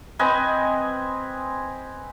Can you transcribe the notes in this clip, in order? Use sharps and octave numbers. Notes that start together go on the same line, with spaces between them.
C4 B4 D#5 G#5